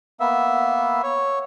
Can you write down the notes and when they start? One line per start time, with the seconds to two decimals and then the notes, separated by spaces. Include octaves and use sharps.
0.20 A#3 B3 E5
1.03 C#5